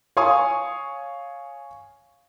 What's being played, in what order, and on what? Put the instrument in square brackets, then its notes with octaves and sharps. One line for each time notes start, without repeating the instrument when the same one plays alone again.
[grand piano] C#5 F5 G#5 C#6 D#6